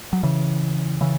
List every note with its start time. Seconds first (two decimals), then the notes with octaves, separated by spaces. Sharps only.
0.13 F#3
0.23 C#3 E3
1.01 C#3 E3